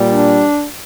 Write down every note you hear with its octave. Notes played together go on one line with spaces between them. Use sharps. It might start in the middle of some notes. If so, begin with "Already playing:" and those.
Already playing: A#2 G3
D4